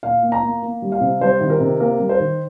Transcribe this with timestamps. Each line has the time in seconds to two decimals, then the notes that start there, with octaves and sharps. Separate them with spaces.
0.03 A#2 F5
0.23 A#3
0.32 A#5
0.43 A#3
0.62 A#3
0.82 G3
0.92 F5
1.01 C3
1.21 G3 C5
1.40 D#3
1.50 A#4
1.60 C3
1.80 A#3 A#4
1.99 G3
2.09 C5
2.19 D#3